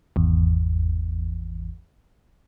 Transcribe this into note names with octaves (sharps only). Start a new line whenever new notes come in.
G#1 E2